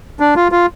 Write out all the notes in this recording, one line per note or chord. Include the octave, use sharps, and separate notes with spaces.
D4
F4
F4